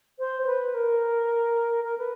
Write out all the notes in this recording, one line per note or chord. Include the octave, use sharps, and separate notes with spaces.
C5
C5
B4
A#4
A#4
B4